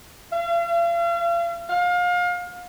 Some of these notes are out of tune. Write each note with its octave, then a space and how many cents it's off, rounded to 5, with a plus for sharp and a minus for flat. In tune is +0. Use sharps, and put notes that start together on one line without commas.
F5 -40
F5 +30